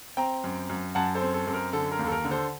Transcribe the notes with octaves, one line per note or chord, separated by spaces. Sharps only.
C4 G5 A#5
F#2
F#2
F#2 F#5 A5
A4 C5
C4
A4
F#2 A4
A#4
D3 A4
A#4
D#2
A4
A#4
D3
A4 C5